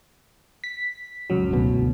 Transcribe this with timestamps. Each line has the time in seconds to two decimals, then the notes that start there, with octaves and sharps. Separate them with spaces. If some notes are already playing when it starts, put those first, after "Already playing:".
0.64 B6
1.30 C#2 F#2 F#3
1.51 D1 D2 B2